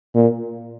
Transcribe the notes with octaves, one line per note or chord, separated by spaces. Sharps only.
A#2